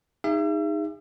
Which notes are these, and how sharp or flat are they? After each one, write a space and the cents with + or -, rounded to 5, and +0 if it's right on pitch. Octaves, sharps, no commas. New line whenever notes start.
D#4 +0 G#4 -35 E5 +40